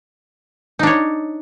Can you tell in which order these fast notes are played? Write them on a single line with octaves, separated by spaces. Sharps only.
D#4 D4 C#5